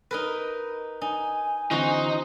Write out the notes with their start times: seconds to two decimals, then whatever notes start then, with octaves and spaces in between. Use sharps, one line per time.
0.11 D#4 A#4 B4
1.02 D#4 G#5
1.71 D3 E3 C4 D#4 F#4 C5